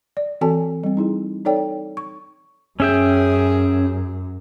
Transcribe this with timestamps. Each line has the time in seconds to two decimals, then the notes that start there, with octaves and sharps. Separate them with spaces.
0.17 D5
0.41 E3 C4 F#4 A4 G#5 A5
0.83 G3 C4
0.97 D#4 E4 G#4
1.45 D#4 A4 C#5 D5 G5
1.97 C#6
2.80 F#2 C#4 G#4 E5 G5